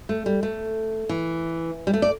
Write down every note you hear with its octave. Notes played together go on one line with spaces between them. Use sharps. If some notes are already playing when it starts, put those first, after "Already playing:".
A3
G3
A3
E3
G3
A3
D5